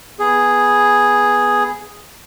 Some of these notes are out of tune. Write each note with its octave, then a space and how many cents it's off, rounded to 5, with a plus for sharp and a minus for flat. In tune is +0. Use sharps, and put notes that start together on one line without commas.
B3 +0 G#4 +0